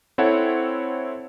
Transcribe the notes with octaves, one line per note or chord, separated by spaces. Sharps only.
C4 E4 A4 C#5 F#5